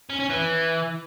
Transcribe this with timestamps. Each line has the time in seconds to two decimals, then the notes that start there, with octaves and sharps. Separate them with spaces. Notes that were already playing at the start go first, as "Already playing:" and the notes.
0.10 C#4
0.20 C#4
0.30 E3